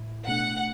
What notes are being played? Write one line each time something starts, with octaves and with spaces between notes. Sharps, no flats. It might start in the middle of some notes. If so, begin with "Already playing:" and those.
Already playing: A2 E4
B2 A3 D4 F#5